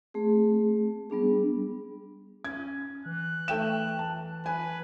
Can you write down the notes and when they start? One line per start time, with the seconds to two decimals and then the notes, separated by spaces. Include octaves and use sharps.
0.14 A3 C4 G#4
1.10 G3 B3 D4 G#4
2.44 C#4 G#6
3.06 E3 F#6
3.48 A3 G5 E7
3.99 A5
4.46 B4 G#5